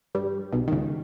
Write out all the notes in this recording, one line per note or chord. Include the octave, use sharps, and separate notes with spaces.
G2 G3
B1 B2
D#3
C#2 C#3